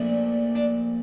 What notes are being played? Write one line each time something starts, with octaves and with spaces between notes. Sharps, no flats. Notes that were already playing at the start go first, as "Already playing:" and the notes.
Already playing: A#1 A#2 F3 A3 D4
D4